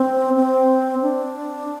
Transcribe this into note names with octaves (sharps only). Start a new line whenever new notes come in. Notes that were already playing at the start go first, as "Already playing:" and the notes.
Already playing: C4
C4
D4